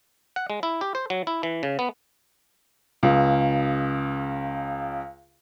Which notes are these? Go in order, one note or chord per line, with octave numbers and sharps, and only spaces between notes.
F#5
G#3
E4
G4
C5
F#3
E4
E3
C#3
B3
C#2 C#3